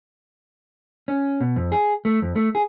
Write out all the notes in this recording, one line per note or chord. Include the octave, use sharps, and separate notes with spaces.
C#4
B2
F2
G#4
A3
F2
A3
G#4